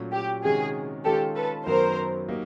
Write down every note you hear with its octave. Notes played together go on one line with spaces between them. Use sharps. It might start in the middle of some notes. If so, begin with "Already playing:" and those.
Already playing: A#2 F#3 A3 C#4
G4
C3 D#3 G#3 C#4 F#4 G#4
D#3 G#3 C#4 F4 G4 A4
A4 B4
F#2 D#3 F#3 B3 A#4 C5
F#3 A#3 D#4 G4